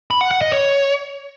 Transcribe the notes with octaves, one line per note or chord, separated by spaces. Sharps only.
B5
F#5
F#5
D#5
C#5